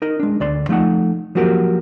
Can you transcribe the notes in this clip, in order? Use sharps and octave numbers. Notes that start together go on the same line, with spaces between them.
D#4 A#4 D#5
G#3 D4
D2 D5 C6
F3 A3 D#4 F#5
F3 F#3 A#3 F#4 G4 A#4